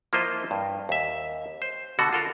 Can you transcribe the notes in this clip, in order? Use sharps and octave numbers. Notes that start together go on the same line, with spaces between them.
F3 A#3 E4 F4 C5 D#5
G2
D#2 E5
C5
B2 D3 F#4 A4
F4 A4 A#4